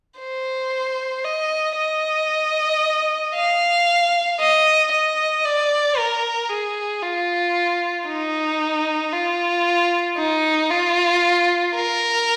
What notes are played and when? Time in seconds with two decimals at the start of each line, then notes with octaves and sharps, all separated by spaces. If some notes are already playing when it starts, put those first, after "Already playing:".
0.19 C5
1.24 D#5
1.77 D#5
3.35 F5
4.40 D#5
4.92 D#5
5.45 D5
5.98 A#4
6.49 G#4
7.02 F4
8.07 D#4
9.12 F4
10.18 D#4
10.70 F4
11.74 A#4